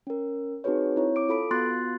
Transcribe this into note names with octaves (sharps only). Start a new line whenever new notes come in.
C#4 A#4
C4 D#4 F#4 G#4 B4 C#5
C4 E4 C#5
D6 D7
F4 A4 B5 D7
B3 F4 F#4 C6 F#6 A6